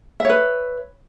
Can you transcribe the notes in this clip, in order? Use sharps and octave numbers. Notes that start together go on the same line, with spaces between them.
B4 C#5 E5